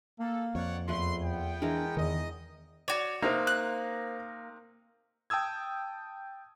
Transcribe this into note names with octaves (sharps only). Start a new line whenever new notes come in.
A#3 A4
F2 C#5 D5 F#5
E2 F3 A3 B4 C6
B3 G5
E3 G#3 D4 A#4
E2 D#3 D#5
F#4 C#5 D5
C3 A#3 D#4 A#4 C5
F#6
G5 A5 D#6 E6 G#6